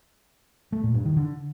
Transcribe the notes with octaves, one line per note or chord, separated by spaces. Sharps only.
A3
A#2
G2
D#3
D3